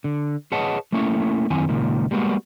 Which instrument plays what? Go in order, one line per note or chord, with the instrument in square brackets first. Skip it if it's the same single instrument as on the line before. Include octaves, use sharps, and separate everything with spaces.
[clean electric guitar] D3
G#4 B4 C#5 D#5 F#5 A5
A3 A#3 C#4 E4 C#5
F#2 D#3 B3 C4 E4 G#5
C#2 A#2 D#3
G3 G#3 A#3 B3 F#4